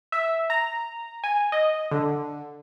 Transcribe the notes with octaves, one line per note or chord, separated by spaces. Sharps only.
E5
A#5
G#5
D#5
D3